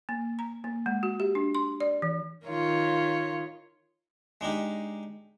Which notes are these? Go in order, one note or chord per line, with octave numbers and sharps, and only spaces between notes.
A#3
A#5
A#3
G#3
F#4
G4
D4
C6
D5
E3
D#3 F4 C#5
G#3 D4 D#4 G4